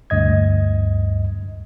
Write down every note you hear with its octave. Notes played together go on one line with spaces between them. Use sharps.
D2 G2 D#5 G#6